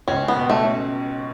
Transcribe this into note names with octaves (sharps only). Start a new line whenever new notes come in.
C#2 C#4
B3
B2
A3
C#4